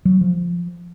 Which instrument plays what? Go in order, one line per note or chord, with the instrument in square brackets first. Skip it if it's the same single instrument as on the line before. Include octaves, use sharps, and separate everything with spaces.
[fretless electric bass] F#3
F3